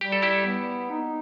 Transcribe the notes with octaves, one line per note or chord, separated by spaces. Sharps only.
G3 G4
A4
E4 G4
B3
D#4